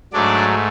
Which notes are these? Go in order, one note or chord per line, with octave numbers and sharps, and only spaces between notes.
G#2 F#3 A3 D4 D5